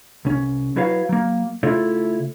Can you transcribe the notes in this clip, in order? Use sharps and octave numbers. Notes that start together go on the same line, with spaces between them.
C2 C#4
F#3 E4 F#4 B4 C#5 F5
F#3 A#3
C#3 A3 E4 F4 A4 C#5